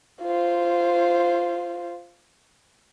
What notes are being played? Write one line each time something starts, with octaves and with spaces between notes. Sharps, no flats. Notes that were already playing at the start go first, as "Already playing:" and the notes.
F4 C5